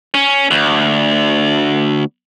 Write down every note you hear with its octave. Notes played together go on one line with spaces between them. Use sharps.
C#4
D2